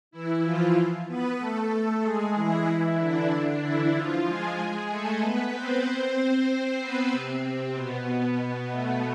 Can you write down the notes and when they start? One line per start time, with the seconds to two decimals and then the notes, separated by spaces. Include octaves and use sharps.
0.11 E3 E4
0.43 F3 F4
1.07 B3 B4
1.39 A3 A4
2.03 G#3 G#4
2.35 E3 E4
2.98 D3 D4
3.61 E3 E4
3.94 F3 F4
4.25 G#3 G#4
4.89 A3 A4
5.20 B3 B4
5.53 C4 C5
5.84 C4 C5
6.48 C4 C5
6.79 B3 B4
7.11 C3 C4
7.74 B2 B3
8.70 A3